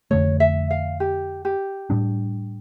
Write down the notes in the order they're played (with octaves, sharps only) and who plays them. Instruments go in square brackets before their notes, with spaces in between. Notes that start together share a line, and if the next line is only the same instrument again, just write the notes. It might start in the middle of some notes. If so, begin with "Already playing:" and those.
[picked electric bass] F2 D3 A3 [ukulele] C#5
[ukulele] E5
F5
G4
G4
[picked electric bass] A2 G3 D4